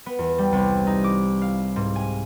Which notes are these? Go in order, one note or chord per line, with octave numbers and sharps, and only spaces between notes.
B3
E2
G3
C2
D#4
D6
F5
G#2
G#5